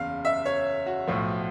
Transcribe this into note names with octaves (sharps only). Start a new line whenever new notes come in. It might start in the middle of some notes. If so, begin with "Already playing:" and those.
Already playing: F#1 E2 C#3 F5
E5
C#5
F#4
B1 A2 F3